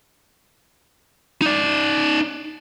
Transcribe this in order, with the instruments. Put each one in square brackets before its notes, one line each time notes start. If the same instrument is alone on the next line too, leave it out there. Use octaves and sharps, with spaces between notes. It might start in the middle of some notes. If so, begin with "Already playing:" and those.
[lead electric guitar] D#4 D5